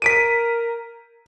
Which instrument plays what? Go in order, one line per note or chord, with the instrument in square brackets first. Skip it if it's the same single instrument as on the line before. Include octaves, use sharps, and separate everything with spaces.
[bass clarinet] A#4 [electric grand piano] B6 D7 D#7